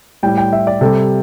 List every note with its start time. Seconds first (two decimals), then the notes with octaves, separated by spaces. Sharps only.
0.23 A2 G3 G5
0.38 G5
0.53 E5
0.67 D5
0.81 C3 G3 A4